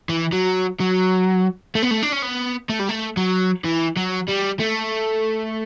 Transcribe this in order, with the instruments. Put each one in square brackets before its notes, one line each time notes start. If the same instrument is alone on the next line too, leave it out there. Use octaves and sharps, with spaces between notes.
[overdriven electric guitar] E3
F#3
F#3
A3
B3
A3
D4
C#4
B3
A3
G3
A3
F#3
E3
F#3
G3
A3